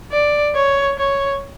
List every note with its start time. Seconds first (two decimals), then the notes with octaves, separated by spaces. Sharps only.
0.12 D5
0.55 C#5
0.98 C#5